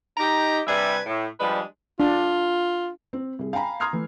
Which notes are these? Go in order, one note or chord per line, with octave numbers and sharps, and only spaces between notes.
D#4 G4 A#5
C3 G3 D4 B4 E5 G#5
A2
F3 G3 G#3 D4 B4
D4 F4
C4
C2 G#4
F5 G5 G#5 A#5 B5
A#5 C6 D#6 F6 G#6 C7
E3 A3